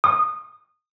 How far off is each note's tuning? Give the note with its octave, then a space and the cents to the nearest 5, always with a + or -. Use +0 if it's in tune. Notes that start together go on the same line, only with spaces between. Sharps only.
D#6 -20